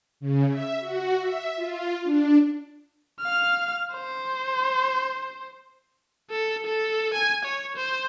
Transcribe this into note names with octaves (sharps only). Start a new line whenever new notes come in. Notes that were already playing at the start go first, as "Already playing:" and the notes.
C#3
E5
F#4
E5
F4
D4
F5 F6
C5
A4
A4
G#5
C#5
C5